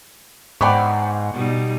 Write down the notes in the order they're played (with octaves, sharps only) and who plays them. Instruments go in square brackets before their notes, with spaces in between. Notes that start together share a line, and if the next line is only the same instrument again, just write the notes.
[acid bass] G#2 [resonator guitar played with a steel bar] B3 C5 D5 [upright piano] F#5 G5 C#6
[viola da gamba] B2 G3 D#4